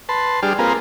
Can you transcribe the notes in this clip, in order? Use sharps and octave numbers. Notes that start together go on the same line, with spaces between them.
B4 A5 C6
G3 D4 G4 G#4 F6
A#3 C4 F4 G#4 A#4 B4